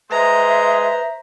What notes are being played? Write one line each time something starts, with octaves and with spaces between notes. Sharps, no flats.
G#3 B4 C5 E5 A#5